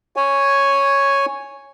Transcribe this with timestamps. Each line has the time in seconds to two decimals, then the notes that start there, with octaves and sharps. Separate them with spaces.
0.16 C#5 G#5